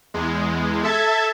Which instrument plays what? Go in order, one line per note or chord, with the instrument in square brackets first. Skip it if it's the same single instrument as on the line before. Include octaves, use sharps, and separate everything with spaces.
[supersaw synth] E2 G#3
A4 E5 A5 G#6